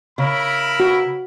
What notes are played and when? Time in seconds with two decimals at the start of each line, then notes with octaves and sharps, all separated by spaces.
0.18 C#3 E4 A#4 B5
0.80 F#4